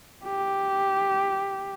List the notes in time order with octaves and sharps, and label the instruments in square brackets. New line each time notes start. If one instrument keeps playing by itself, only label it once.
[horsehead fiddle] G4